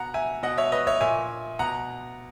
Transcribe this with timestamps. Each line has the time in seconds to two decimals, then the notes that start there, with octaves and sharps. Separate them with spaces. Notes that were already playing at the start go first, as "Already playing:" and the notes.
Already playing: B2 F#5 A#5
0.14 E5 G#5
0.43 B2 D#5 F#5
0.58 C#5 E5
0.72 B4 D#5
0.87 C#5 E5
1.01 A#2 E5 G#5
1.59 B2 F#5 A#5